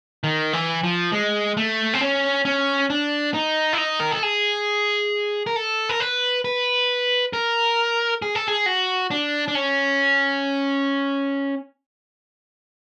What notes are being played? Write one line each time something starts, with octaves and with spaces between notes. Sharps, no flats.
D#3
E3
F3
G#3
A3
C4
C#4
C#4
D4
D#4
E4
D#4
A#4
A4
G#4
A#4
A4
A#4
B4
B4
A#4
G#4
A4
G#4
F#4
D4
D4
C#4